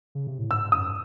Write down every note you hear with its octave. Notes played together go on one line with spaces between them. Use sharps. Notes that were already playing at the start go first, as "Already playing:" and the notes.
C#3
C3
A2
G#2 E6
F#2 D#6